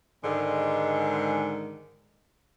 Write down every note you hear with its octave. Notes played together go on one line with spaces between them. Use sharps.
G#2 D3 D#3 G#3